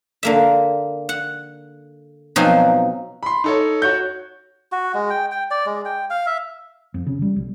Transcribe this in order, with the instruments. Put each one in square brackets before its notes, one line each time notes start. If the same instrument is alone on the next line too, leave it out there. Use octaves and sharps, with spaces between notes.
[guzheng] D3 A#3 E5
F#5
B2 F3 F#3 C4 D#4 G#5
[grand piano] B5 C6
D#4 A4 C#5
F#4 C#5 G6
[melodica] F#4
G#3
G5
G5
D5
G#3
G5
F5
E5
[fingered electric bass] F2
C#3
G3
B1